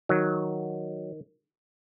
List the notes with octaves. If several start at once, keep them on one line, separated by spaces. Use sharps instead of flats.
D#3 F#3